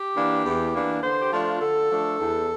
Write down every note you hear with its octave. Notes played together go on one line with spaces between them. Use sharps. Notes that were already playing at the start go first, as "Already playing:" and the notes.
Already playing: G4
E3 A#3 D4
E2
E3 A#3 D4
D3 C5
G4
F3 A3 D4 F4
D3 A4
F3 A3 D4
E2